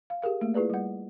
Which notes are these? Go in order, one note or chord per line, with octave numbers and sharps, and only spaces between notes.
F5
G4 G#4 A#4 F5
A3 A#3
E4 F4 G#4 B4 D5
G3 F#5